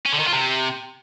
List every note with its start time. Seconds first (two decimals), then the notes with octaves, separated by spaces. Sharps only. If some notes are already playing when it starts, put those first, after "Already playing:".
0.06 C#4
0.13 D3
0.19 D#3
0.26 F4
0.33 C3